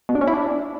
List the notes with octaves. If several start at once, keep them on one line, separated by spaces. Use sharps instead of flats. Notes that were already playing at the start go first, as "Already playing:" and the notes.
B2
D4
C#4
E4
D4